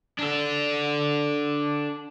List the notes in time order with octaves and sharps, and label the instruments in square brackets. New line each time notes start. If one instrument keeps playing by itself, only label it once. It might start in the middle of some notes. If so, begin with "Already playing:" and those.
[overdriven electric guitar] D4 A4